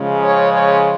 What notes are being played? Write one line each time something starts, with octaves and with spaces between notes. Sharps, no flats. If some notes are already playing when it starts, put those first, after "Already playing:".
Already playing: C#3 F3 G#3
C#5
C#5